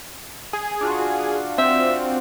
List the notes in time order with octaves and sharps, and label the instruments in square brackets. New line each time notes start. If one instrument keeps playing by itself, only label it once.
[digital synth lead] G#4
[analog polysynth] D4 F4 F#4
[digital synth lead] C4 [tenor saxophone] E5